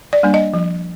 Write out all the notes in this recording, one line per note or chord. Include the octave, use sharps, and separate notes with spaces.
D5
G3 A#3 D4
D#5
F3